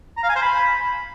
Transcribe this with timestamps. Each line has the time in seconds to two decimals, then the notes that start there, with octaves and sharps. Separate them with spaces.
0.17 A#5
0.23 F5
0.29 G#5
0.36 C5
0.42 B5